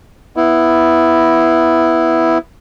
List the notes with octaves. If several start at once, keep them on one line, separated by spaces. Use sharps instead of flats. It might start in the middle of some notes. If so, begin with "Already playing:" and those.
B3 E4